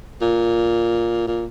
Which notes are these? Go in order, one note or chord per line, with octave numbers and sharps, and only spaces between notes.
A#2
A#2